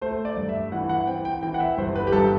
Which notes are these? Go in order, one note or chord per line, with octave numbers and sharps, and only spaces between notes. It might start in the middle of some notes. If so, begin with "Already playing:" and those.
A3 C5
D5
G2
E5
E3 F#5
F#5
C4 G5
G5
E3 G5
F#5
E5
G1 C5
B4
G4
G2 A4